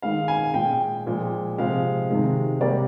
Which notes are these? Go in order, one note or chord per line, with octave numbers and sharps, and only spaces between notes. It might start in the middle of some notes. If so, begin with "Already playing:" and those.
D#3 G#3 F5
G#5
A#2 G#3 G5
A#2 F3 G#3
C3 F3 G#3 F5
C3 D#3 G#3
C3 G3 A#3 D5